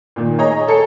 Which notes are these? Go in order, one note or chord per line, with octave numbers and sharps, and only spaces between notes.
A#2 D#3
G#4 C#5 D#5 A#5
A4 C#5 C#7